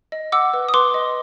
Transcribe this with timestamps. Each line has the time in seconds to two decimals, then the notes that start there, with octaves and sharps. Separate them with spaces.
0.12 D#5
0.32 F#5 D6 E6
0.54 B4
0.69 D#6
0.74 B4 C6 D6
0.94 D#5